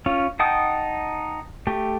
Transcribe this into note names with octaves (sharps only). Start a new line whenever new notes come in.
C#4 F4
D#4 F#5 G5 A5 D#6
A3 G4